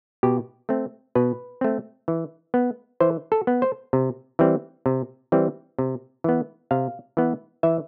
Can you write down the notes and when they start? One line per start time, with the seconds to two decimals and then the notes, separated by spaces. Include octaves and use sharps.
0.23 B2 G4
0.69 A3 C4
1.15 B2 B4
1.61 A3 C4
2.08 E3
2.54 B3
3.00 E3 C5
3.32 A4
3.47 B3
3.62 C5
3.93 C3
4.39 E3 G3 C4
4.86 C3
5.32 E3 G3 C4
5.79 C3
6.24 E3 B3
6.71 C3 F5
7.17 E3 B3
7.63 E3 E5